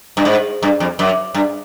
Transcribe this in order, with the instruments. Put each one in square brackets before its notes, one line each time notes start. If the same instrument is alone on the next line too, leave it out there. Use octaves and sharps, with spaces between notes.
[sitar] G2
G#2
G2
F2
F#2
G2